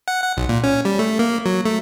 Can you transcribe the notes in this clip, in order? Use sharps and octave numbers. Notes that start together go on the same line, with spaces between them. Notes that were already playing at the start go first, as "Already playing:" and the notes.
F#5
F#5
B1
A#2
C#4
G3
A3
A#3
F#3
A3